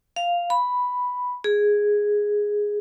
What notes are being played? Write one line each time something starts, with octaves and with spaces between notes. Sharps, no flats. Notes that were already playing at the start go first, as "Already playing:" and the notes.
F5
B5
G#4